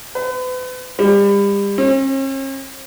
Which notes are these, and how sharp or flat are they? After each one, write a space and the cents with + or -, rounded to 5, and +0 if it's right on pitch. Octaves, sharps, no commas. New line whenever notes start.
B4 +40
G3 +35
C#4 -45